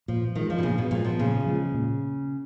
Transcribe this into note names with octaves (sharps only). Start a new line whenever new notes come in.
A#2 F3
D#3 F3 G#3
F3
B2
A#2 C#3
B2
A#2 F3 G#3
F3
A#2 C#3
F3 G#3
A#2